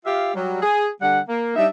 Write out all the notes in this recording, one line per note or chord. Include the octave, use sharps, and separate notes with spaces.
F4 G4 E5 F5
F#3 G3
G#4
D3 G3 F#5
A#3
G3 D4 D#4 E5